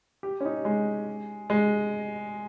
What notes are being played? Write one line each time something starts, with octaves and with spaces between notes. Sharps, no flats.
G4
C#4
D#4
G#3
G#3